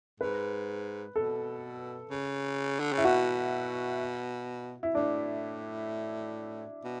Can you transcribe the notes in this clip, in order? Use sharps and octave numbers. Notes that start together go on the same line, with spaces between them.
G#2 B4
B2 A4
C#3
D3
C#3
E4
B2 F#4
E4
A2 D4
B2